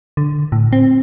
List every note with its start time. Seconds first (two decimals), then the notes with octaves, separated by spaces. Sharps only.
0.17 D3
0.52 A2
0.73 C4